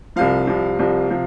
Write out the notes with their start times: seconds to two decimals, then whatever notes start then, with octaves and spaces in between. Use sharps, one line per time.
0.16 C2 C3 F3 F5
0.47 C2 C3 F3
0.79 C2 C3 F3
1.10 C3 F3